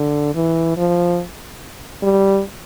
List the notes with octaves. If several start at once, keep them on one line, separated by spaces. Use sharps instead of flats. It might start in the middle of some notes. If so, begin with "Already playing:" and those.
Already playing: D3
E3
F3
G3